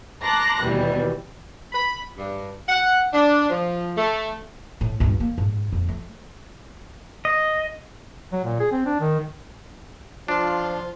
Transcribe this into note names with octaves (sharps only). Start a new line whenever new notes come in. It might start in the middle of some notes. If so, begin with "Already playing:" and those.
A5 A#5 C6 D6 F#6 A#6
D#2 B2 E3 G3
B5
G2
F#5
D4
F3
A3
A2
C#2 G2
A#3
G#2
F2
A3
D#5
F#3
A#2
G#4
C4
D4
D#3
F3 D4 F4